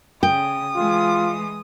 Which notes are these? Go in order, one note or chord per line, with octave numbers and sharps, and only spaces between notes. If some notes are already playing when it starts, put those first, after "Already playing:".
C#3 G5 D#6
E3 G#3 F4